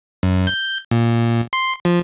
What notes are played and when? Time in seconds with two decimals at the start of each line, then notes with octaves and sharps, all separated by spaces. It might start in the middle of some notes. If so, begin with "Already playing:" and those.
0.23 F#2
0.47 G6
0.91 A#2
1.53 C6
1.85 F3